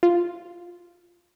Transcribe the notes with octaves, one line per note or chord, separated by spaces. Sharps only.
F4